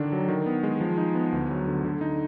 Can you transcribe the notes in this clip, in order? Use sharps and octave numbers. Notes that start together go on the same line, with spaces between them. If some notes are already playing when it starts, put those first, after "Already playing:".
Already playing: D3 D#3 D4
F#3
D#3
B3
G#3
F3
D#4
B3
D2
F#3
D3
D3
D#4